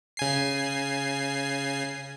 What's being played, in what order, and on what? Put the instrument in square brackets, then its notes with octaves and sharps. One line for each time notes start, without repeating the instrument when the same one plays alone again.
[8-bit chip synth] C#3 G#5 C7